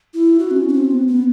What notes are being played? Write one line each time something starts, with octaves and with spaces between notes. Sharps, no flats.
E4
F#4
C4
C#4
C#4
C4
B3
B3